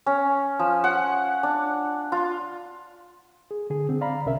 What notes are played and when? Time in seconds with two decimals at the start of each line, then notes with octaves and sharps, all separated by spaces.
0.06 C#4
0.59 F3
0.84 F#5
1.43 D4
2.12 F4
3.51 G#4
3.70 D3 G#4
3.89 D3 C4
4.01 D5 F5 A#5 B5
4.26 C2 C3 C#4 A#4 E5